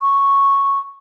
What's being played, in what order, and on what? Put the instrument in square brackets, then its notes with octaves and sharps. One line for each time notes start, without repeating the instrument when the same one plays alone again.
[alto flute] C#6